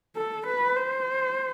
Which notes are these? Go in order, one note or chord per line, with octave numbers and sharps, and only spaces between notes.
A4
B4
C5